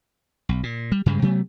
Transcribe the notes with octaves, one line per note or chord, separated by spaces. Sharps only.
B1
A#2
G3
G2 C#3 G3 G#3
C3 F#3 A3 B3